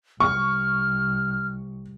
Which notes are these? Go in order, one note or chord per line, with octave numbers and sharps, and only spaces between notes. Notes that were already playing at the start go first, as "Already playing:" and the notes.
C2 C#6 F6